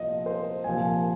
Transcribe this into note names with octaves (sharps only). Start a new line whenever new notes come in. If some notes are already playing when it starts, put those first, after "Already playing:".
Already playing: C2 A#2 F3 D#5
C5
C2 A#2 F3 G#5